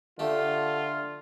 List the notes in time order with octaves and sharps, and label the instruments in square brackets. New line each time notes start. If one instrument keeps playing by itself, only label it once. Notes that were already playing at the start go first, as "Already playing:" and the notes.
[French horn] D3 [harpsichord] A3 G4 [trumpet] F4